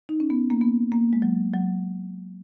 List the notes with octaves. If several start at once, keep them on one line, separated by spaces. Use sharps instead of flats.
D#4
C#4
B3
A#3
B3
A#3
G#3
F#3
F#3